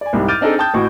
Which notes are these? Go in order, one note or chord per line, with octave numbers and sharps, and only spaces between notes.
D5 G#5
C2 G#2 G3
D6 F6 G6 A6 D7 D#7
C4 D4 D#4 G#4 A4 D5
G5 A5 D#6 G6
A1 A2 F#4 C#6